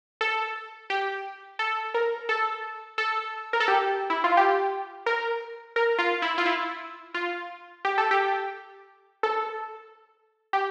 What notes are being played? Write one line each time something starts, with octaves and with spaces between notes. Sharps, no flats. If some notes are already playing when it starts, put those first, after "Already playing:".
A4
G4
A4
A#4
A4
A4
A#4
A4
G4
E4
F4
G4
A#4
A#4
F4
E4
F4
E4
F4
G4
A4
G4
A4
G4